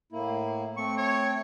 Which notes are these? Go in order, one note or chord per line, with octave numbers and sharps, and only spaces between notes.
A2 A#3 E4
A3 C4 C#6
C#5